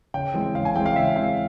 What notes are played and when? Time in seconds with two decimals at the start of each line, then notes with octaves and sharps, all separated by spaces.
0.14 C#3 G5
0.34 E3 G#3 C4
0.55 C#3 F5
0.65 G#5
0.75 E3 G#3 C4 G5
0.86 F5
0.96 C#3 E5
1.16 E3 G#3 C4 F5